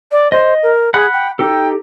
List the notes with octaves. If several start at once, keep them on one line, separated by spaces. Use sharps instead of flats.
D5
C5 D#5
A#4
G#4 F#5 B5 F#6
G5
D#4 G4 A4 G5